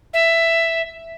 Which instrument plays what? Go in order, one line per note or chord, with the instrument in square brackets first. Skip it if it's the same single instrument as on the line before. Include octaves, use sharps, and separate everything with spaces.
[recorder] E5